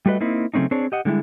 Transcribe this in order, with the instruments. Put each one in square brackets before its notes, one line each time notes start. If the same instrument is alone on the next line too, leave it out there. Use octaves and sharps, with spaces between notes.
[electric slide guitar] G3 A3 F#4 B4 D#5
A#3 C4 D#4 E4
C#3 F#3 A3 C4 C#4 D#4
C4 D4 G#4 C5 C#5
G4 D#5 F#5
D3 G3 G#3 C#4 E4